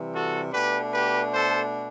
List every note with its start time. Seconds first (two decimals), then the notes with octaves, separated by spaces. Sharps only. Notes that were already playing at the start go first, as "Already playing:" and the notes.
Already playing: C3 E3 G3
0.13 F#4 A4
0.53 B2 A3 D4 G4 B4
0.93 G4 B4
1.33 A4 C5